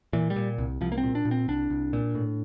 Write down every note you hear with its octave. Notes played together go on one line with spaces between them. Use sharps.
A#2 E3
G3
A#2
C2
C2 F3
A#3
C4
A#2
D4
A#2
C4
C2 D4
C2
A#2
A2